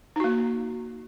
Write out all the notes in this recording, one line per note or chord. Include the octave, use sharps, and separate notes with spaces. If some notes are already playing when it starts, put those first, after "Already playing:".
A#3 D#4 F#4